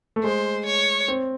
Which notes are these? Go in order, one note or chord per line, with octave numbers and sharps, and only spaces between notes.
A3
G#3 C5
C#5
C4